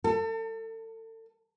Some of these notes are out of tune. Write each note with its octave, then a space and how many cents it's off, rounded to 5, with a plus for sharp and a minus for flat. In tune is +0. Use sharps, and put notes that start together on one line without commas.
A4 +35